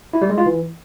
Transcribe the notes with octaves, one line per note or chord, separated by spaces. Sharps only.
E4
G3
G#3
F4
E3